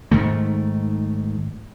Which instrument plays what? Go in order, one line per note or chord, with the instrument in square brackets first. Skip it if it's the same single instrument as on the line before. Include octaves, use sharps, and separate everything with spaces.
[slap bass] G#2 D#3 A3